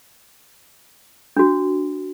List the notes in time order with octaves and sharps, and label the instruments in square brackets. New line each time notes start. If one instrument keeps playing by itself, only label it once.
[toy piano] D4 F#4